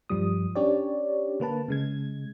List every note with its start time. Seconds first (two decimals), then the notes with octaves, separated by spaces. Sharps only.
0.10 G2 F3 G3 D#6
0.56 C#4 D4 G4 C#5 D5
1.40 D3 A#3 B4 A5
1.68 C#3 G#3 G#6